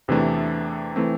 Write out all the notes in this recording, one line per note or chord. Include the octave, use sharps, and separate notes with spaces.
E2 C3 E3 A3 D4
E3 A3 C4